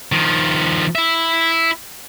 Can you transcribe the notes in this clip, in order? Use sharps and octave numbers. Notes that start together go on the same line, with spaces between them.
D#3 F3
E4 E5